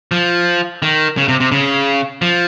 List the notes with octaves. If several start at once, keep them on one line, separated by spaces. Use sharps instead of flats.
F3
D#3
C#3
C3
C3
C#3
F3